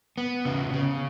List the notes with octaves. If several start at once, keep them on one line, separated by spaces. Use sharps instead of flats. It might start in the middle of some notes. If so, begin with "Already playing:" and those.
B3
C#3
C#3